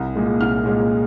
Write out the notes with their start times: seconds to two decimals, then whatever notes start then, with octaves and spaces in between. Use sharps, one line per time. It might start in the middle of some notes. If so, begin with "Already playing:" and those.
Already playing: C2
0.15 A#2 G#3
0.40 C2 F6
0.66 A#2 G#3